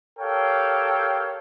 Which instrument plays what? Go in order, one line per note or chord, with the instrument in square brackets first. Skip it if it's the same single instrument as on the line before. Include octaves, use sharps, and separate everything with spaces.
[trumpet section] G4 A4 A#4 C#5 F5 G5